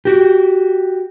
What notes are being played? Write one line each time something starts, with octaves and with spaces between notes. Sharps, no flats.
F#4 G4